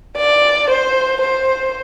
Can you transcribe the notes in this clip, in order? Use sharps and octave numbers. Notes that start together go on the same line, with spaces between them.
D5
C5
C5